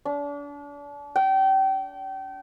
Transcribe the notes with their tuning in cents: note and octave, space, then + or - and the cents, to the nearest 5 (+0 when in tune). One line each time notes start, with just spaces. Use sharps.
D4 -35
G5 -30